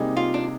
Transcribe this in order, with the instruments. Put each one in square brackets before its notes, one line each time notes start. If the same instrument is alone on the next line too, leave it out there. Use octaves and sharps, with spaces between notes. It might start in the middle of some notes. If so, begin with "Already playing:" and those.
Already playing: [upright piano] C3 G3 A#3 D#4 G#4
[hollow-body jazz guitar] F4
D4